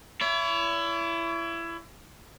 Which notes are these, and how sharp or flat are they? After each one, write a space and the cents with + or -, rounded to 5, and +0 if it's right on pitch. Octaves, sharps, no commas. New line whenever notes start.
E4 +25 C#5 +40